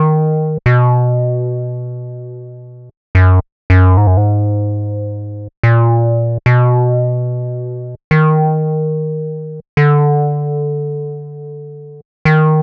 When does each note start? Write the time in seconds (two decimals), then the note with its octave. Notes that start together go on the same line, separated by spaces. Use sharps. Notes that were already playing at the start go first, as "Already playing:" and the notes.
Already playing: D#3
0.66 B2
3.15 F#2
3.70 F#2
3.97 G#2
4.07 F#2
4.17 G#2
5.63 A#2
6.46 B2
8.11 D#3
9.77 D3
12.25 D#3